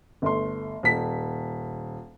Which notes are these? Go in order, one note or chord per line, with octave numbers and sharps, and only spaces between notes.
G1 A3 C6
D#1 B6